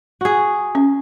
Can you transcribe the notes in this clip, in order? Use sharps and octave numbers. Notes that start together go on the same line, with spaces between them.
F#4 G#4
C#4